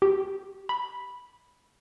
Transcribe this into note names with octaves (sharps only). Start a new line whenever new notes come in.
G4
B5